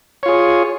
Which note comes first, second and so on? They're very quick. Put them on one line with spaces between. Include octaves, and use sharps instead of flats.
C#5 F4 G#4